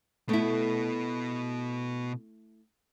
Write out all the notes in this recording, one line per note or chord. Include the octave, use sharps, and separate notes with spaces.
B2 A3 B3 E4